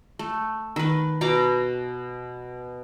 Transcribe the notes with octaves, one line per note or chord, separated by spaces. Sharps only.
A3
D#3 B4
B2 B3 A#5 D6